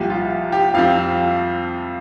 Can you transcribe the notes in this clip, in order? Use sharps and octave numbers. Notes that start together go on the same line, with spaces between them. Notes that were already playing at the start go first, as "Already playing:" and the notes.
Already playing: C2 A#2 F3 G4
F4
G4
F2 F3 C4 F5